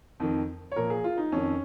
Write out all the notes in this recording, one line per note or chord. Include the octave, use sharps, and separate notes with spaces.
F2 D#3
C#5
A#2 F3 A#4
G#4
F4
D#4
F2 D#3 C#4